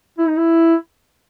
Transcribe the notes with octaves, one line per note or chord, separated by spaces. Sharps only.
E4
D#4
E4